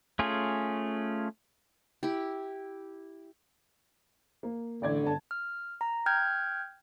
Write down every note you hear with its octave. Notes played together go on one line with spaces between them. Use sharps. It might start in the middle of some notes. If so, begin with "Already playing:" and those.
A3 C#4 F4 G#4
E4 G4
A#3
A1 D3 D5 G#6
G1 A5
F6
A#5
G5 F6 G6 G#6